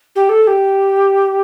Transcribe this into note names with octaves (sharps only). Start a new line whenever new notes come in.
G4
A4
A4
G4